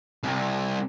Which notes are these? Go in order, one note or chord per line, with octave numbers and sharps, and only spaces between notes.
C2